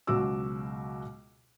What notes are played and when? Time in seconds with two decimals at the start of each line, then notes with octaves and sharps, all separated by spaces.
0.07 C#2 B2 F#3 F#4 D6 E6